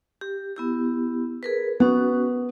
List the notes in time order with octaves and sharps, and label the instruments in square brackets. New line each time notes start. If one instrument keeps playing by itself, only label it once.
[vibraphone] G4
B3 E4 G4
G#4 A#4 B4
[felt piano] B3 [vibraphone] C#4 F#4